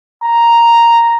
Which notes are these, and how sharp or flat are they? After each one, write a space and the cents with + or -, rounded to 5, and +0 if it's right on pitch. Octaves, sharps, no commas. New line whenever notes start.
A#5 +0